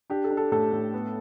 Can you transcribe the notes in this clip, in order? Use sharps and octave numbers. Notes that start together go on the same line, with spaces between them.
D4 G4
A4
D4
A4
A2 A4
A2
B3